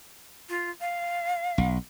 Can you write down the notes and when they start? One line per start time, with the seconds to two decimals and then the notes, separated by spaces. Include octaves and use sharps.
0.49 F4
0.81 F5
1.58 B1